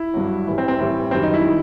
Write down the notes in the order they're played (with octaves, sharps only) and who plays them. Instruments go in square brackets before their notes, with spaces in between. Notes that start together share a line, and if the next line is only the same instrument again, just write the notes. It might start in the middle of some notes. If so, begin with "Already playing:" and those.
Already playing: [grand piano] E4
G2 F#3
A2 E3 G3
C4
C4
A2 E3 G3
F#2 D#3 G3 C4
D#4
E4
D#3 G3